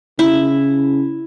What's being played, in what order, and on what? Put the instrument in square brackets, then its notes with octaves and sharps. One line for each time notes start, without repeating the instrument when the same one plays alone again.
[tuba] C#3 [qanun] E4